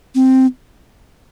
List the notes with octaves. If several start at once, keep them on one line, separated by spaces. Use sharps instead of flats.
C4